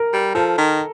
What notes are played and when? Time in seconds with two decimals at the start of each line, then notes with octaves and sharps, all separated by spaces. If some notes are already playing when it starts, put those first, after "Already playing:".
Already playing: A#4
0.13 G3
0.35 F3 A4
0.58 D#3